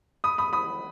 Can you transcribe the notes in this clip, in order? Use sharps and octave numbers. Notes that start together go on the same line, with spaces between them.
B5 D#6
B5 D#6
B5 D#6